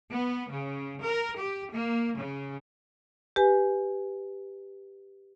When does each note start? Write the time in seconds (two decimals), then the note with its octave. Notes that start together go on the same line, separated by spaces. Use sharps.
0.10 B3
0.50 C#3
1.02 A#4
1.39 G4
1.72 A#3
2.17 C#3
3.36 G4 B4 G#5